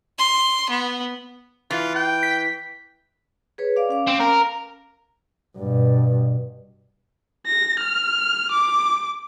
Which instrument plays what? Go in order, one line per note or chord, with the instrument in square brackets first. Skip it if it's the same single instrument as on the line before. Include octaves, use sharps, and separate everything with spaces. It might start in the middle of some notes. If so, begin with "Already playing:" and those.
[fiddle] C6
B3
[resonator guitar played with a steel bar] E3 [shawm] F4
[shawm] G5
[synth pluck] B6
[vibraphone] G#4 B4 C#5
D5 F5 D6
C#4 F5 D6
[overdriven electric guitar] C4
A#4
[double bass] G2 B2
[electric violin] A#6
F6
D6